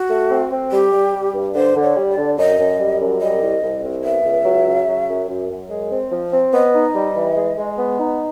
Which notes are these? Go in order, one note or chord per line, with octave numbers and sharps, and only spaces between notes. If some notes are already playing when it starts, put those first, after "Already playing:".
Already playing: F#4
A3
C4
C4
G3 G4
G3
G3
G2
D3 C5
D3
C#5
G3
D5
D3
F#2 D#5
F#2
G3
F#2
G3 D#5
C2
C2
C2
B3 E5
C#2
F#3
C#3
F#3
F#2
F#2
F#2
G#3
C4
F3
C4
B3 D#5
D#4
G3
E3
G#3
G#3
B3
D#4